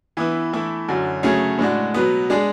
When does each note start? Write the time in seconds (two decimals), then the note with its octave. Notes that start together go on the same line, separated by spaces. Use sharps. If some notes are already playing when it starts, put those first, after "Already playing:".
0.17 E3 B3 E4
0.53 E3 A3 E4
0.89 F#2 D3 F#3
1.23 C#3 F#3 A3 C#4 G#4
1.59 A2 G#3 D4 F#4
1.94 B2 F#3 B3
2.30 G#3 D4 G#4